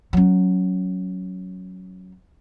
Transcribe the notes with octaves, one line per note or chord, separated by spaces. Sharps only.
F#3 C#4